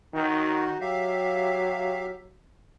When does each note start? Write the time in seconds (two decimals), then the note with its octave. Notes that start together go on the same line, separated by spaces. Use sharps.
0.14 D#3 D#4 F#4
0.81 F#3 G4 E5 F5